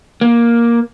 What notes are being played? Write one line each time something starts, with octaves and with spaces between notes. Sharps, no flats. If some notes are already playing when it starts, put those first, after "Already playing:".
A#3